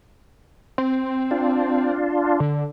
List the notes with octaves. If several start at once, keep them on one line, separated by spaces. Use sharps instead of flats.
C4
D4 F4
D3